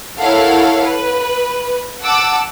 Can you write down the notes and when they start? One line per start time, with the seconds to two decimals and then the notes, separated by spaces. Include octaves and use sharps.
0.21 E4 A4 A#4 C#5 F5 F#5
0.84 B4
2.05 F#5 A5 D6 E6